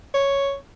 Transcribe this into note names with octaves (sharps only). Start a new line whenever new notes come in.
C#5